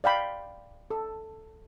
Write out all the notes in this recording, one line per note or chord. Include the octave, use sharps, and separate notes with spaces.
D5 F5 G5 B5
A4